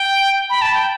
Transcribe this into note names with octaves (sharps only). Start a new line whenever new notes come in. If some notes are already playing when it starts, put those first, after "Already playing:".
Already playing: G5
B5
A5
G5